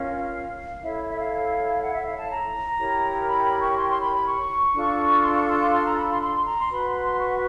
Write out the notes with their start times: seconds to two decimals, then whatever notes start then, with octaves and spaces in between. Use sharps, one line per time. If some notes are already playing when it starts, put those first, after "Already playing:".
Already playing: C#4 F4 A#4 F5
0.83 E4 A4 C#5 E5
1.08 E5
1.19 F5
1.81 F#5
1.93 E5
2.06 F5
2.18 A5
2.30 A#5
2.79 E4 G4 A#4 C#5
3.27 B5
3.44 B5
3.60 C#6
3.76 C6
3.89 C6
4.01 B5
4.13 B5
4.25 C#6
4.74 D4 F4 A4
5.23 C6
5.35 C#6
5.48 C6
5.60 C6
5.73 C6
5.84 A#5
5.97 B5
6.09 C6
6.22 C6
6.45 A#5
6.59 C6
6.70 F#4 B4 B5
6.87 C6
7.03 C6
7.19 C#6